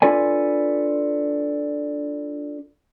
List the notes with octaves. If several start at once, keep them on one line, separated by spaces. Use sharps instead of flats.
D4 F4 A4 B4 D5 G#5